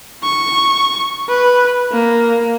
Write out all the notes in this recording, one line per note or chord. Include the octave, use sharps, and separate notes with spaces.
C#6
B4
A#3